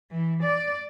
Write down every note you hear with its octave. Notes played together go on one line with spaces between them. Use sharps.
E3
D5